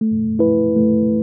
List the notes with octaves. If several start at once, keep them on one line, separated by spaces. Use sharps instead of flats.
A3
E4 B4
A3